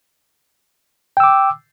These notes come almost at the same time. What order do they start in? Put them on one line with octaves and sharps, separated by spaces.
G5 E6 D6